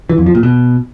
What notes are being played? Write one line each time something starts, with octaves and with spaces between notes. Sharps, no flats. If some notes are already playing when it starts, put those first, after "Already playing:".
E3
F2
F3
A#2
B2